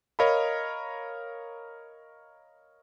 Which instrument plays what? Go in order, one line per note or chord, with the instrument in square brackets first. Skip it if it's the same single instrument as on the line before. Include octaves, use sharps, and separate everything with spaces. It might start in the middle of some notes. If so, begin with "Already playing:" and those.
[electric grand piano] A#4 C#5 D#5 F5 A#5 B5